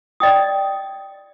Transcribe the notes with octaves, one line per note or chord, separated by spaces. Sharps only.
D5 D#5 G5 D#6